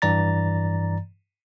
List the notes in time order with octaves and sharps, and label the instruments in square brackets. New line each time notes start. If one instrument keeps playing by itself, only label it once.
[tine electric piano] G2 E3 D5 A#5 A6